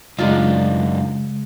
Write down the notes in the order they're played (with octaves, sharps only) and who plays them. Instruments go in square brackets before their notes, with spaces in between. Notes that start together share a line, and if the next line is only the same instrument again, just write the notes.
[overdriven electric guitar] F#2 D#4 [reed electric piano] C#3 G#3 [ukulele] D4 F4